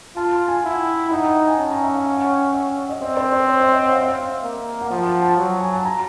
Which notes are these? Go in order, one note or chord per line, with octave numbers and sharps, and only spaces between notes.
F4 A5
A5
G#5
E4 F#5
G5
D#4 F#5
G5
G5
G#5
C#4 A5
A#5
E5
F5
F#5
F#5
G5
F#5
E5
D#5
C4 D5
C5
C5
C#5
D#5
E5
F#5
F5
E5
F5
A#3
F#5
F3 F5
G5
F#5
A5
F#3
G#5
A5
A#5